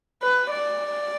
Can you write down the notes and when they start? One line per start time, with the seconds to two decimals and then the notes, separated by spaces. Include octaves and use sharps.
0.22 B4
0.50 D5